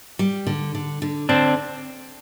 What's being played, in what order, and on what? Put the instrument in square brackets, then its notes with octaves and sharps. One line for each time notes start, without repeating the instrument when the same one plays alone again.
[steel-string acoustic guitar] G3
D3
D3
D3
[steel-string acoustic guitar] D3 [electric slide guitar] C4 D4